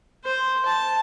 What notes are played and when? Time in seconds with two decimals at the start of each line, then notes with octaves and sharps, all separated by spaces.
0.25 C5
0.65 A5